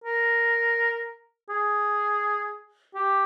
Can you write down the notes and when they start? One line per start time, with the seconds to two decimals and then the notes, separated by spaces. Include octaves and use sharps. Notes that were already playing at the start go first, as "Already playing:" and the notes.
0.04 A#4
1.49 G#4
2.95 G4